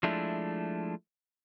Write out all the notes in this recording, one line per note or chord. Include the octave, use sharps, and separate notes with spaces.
F3 G#3 A3 D4 E4